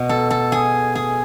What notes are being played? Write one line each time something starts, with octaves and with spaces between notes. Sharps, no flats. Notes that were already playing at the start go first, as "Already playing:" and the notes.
Already playing: B2
A4
A4
G#4
G#4